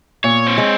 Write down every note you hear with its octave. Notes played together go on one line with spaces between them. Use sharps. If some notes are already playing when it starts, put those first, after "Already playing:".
A#2 C#5
C4
G#3